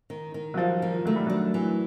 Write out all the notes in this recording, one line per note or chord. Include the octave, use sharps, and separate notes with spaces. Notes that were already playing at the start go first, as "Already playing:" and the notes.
D#3
D#3
F#3
F3 G3
D#3
F#3 A3
G3
F#3 D4
E3